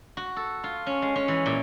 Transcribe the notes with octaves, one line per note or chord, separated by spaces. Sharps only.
F#4
A4
F4
C#4
G#3
C#4
E3
A#2